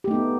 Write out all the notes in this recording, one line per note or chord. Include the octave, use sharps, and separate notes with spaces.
A3 B3 D#4 G4